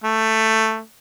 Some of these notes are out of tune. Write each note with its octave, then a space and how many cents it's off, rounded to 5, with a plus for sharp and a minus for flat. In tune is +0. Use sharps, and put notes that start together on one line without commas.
A3 +10